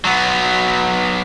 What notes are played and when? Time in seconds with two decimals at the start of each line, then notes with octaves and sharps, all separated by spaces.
0.05 F#3 B3